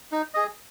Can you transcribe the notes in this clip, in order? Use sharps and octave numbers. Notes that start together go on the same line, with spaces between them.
D#4
G#4 D#5